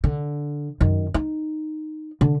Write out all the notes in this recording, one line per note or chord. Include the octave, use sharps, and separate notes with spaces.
D3
F#2 D#3
D#4
D3